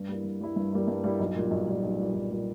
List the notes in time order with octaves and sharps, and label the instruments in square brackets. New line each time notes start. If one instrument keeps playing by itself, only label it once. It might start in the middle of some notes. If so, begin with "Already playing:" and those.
Already playing: [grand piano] G2
G3 A#3 E4
G2
G3 A#3 E4
G2
G3 A#3 E4
G2
G3 A#3 E4
B1
A#2 G3
B1
A#2 G3
B1
A#2 G3
B1
A#2 G3